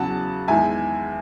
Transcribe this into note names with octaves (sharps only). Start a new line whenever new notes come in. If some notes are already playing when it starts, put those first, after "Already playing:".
Already playing: E2 C#3 F#3 F#5 A5
E2 D#3 G#3 E5 G#5